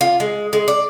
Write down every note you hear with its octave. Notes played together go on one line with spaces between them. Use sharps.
F4
G#3
G#3
D5